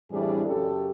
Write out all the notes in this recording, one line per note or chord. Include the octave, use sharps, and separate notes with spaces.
F2 A2 E3 G3 D4 G#4
F#2 C#3 G4 A4